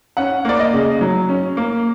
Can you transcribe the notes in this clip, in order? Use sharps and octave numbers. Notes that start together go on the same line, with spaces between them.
C#4 F#5
A#3 D5
D#5
C#3
F#3
C#4
A#3